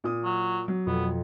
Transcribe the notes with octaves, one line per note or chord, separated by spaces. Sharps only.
A#2 D#6
F#3
F#3
F2 B2 F3 B3